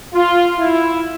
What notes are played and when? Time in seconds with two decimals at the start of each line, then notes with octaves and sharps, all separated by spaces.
0.13 F4
0.58 E4